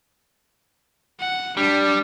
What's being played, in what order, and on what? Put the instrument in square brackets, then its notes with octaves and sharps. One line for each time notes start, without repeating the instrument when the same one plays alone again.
[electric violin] F#5
[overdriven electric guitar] G3 [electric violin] D4